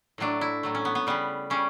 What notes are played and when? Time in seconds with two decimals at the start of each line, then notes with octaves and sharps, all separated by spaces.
0.18 A2 F#3 A3 D4
0.41 E4
0.63 A2 F#3 A3
0.75 C#4
0.85 B3
0.95 B3
1.07 C#3 G3 B3
1.50 C#3 G3 C#4